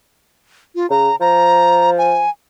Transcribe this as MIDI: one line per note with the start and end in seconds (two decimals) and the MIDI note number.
0.75 0.89 65
0.90 1.10 49
0.90 1.16 82
1.21 2.23 53
1.21 1.90 82
1.98 2.29 80